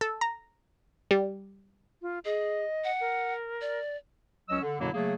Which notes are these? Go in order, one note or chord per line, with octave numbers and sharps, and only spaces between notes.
A4
A#5
G3
F4
G#4 D#5
F#5
A#4
D5
C#2 F#3 C#4 D#5 E6
D3
F#2 B2 D3 F#3 A#3 E4
C#3 F#3 A3 A#3 G#4